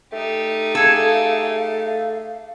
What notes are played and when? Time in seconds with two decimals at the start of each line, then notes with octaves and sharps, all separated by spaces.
0.13 A3 D#4 G4
0.75 G#4 A4 F5